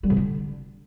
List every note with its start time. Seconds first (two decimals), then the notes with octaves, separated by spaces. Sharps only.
0.03 G3
0.10 C#3
0.16 D3